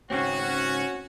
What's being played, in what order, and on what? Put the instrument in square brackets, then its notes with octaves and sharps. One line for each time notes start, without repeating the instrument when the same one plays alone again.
[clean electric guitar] C#2 G#2 C4 [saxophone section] C#4 [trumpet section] F#4